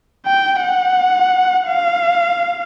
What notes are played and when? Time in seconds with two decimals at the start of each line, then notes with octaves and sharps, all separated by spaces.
0.26 G5
0.62 F#5
1.68 F5